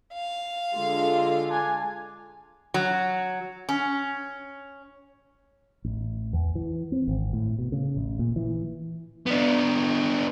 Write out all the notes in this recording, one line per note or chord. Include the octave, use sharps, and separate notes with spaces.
F5
D3 G#3 F4
D4 G#5
F#3
C#4
A1
E2
E3
C4
G#1
A2
B2
C#3
A1
A#2
E3
B3 D4